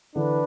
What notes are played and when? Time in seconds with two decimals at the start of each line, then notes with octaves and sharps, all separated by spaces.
0.16 D3 E3 D4 B4